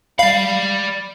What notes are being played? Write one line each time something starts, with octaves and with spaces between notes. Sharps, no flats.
D5 F5 B5